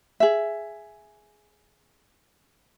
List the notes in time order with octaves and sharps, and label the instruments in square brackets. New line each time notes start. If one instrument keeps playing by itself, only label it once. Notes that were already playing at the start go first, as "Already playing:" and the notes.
[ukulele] G#4 E5